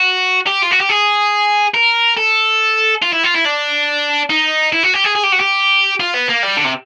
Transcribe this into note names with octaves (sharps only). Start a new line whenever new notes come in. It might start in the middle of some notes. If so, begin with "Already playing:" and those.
Already playing: F#4
G4
F4
F#4
G4
G#4
A#4
A4
F4
E4
F4
E4
D4
D#4
E4
F#4
G4
G#4
G#4
G4
F#4
G4
F4
B3
A#3
G3
D3
C3